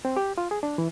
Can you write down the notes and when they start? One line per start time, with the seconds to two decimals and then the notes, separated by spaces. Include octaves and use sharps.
0.05 C4
0.17 G4
0.38 F4
0.51 G#4
0.63 D4
0.78 E3